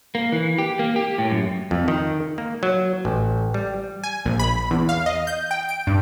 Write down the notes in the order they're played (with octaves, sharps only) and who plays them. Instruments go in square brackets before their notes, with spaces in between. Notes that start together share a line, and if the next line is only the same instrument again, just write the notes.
[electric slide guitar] A#3
E3
G4
A#3
G4
A2
F#2
[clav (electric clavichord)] F2
D#3
A#3
F#3
A1
G3
[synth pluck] G#5
A#1
B5
E2
F5
D#5
G6
G5
D7
G2